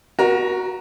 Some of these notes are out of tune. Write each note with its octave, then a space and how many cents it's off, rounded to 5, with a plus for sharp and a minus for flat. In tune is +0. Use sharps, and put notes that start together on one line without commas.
F#4 +0 A#4 +35 A#5 +0